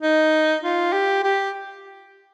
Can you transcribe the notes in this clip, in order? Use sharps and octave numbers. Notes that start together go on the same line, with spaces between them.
D#4
F4
G4
G4